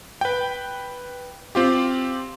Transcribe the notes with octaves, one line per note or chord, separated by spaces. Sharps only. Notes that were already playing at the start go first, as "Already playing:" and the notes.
B4 G5
C4 F4 G4